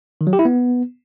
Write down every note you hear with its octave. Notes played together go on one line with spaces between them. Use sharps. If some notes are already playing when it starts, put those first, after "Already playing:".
D#3
F#3
G4
E4
B3